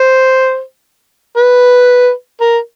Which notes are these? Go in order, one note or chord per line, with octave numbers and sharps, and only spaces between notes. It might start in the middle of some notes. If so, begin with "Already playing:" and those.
Already playing: C5
B4
A#4